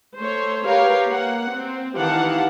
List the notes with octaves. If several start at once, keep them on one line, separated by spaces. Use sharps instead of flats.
A3 C5 C#5
G4 A#4 B4 C#5 F5
A#3 F#5
C4
D#3 E3 G4 F5 F#5 A5